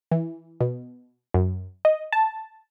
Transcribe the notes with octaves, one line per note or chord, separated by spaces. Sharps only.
E3
B2
F#2
D#5
A5